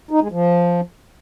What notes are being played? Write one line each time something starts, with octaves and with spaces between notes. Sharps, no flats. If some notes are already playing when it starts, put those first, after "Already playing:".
D#4
G#3
F3